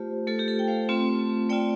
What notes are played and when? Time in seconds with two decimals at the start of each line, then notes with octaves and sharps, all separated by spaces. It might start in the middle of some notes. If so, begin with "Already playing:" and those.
Already playing: A3 F4 G4 C5
0.27 A3 F4 A4
0.39 G4
0.48 A4
0.59 G5
0.68 C5 F5
0.89 A3 C4 F4
1.49 A3 C4 F4 D5 G5